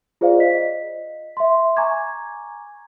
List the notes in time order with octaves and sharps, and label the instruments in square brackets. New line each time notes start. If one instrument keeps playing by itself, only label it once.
[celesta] F4 G#4 C5 D5 F5
D#5 B6
E5 C6
G#5 A#5 C#6 D6 G#6